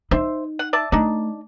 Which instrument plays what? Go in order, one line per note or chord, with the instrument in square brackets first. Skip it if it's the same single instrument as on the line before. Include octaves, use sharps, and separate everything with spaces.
[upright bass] D#4 [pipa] C5 E5
[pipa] F#5
D5 E5 A5
[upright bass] A3 [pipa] D4 D#4